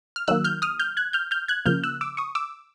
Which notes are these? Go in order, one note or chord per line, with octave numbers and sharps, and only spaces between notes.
F6
D#3 F#3 A#3 E6 F#6
F6 G6
D#6 F6
F6 G6
F#6 G#6
F6 G6
F6 G6
F#6 G#6
C#3 F3 A#3 F6 G6
E6 F#6
D6 E6
C#6 D#6
D6 E6